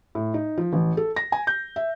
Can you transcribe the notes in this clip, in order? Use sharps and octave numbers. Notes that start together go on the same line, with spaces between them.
A2
D#4
F3
A1
A4
A#6
G#5
G6
E5